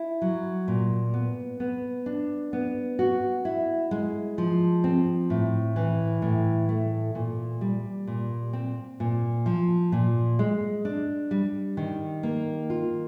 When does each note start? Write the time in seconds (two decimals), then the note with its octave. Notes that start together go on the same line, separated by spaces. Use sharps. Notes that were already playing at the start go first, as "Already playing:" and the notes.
Already playing: E4
0.22 F#3
0.68 A#2
1.14 B3
1.60 B3
2.06 D4
2.53 B3
2.99 F#4
3.45 E4
3.91 G#3
4.38 F3
4.84 C4
5.30 A2
5.76 E3
6.22 A2
6.69 A3
7.15 A#2
7.61 G3
8.07 A#2
8.53 C4
9.00 A#2
9.46 F3
9.92 A#2
10.39 G#3
10.85 D4
11.31 G3
11.77 D#3
12.23 A#3
12.70 F4